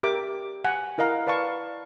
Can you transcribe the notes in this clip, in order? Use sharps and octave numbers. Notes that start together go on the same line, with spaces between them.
G4 A#4 E5 D6
F#5 G#5
E4 A#4 D#5 F5 A#5
B4 D5 F5 A5 C#6